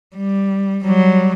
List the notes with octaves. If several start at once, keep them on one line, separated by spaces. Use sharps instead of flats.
G3
F#3 G3